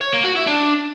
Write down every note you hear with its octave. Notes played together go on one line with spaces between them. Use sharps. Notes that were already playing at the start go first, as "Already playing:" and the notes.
C#5
A#3
F#4
E4
D4